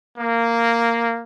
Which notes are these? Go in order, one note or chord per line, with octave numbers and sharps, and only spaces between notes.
A#3